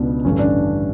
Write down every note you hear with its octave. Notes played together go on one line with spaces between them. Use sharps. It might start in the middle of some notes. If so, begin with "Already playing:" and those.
Already playing: C#2 B2 D4
A1 G2 D3 C#4
D4